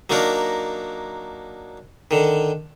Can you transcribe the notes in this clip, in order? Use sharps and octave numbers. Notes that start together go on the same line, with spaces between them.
F#3 A#3 D4 D#4 A#4
D3 D#3